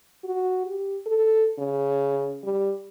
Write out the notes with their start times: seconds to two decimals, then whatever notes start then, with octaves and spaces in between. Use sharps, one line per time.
0.24 F#4
0.67 G4
1.06 A4
1.58 C#3
2.44 G3